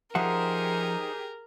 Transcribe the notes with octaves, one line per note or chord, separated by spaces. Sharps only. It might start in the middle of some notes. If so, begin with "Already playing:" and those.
F3 D#4 G4 G#4 A#4 C5 E5 F#5